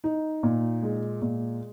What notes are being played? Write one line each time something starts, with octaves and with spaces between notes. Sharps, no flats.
D#4
A#2
G#3
A#2